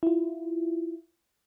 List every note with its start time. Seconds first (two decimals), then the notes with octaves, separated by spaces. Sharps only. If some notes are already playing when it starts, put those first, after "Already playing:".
0.03 E4 F4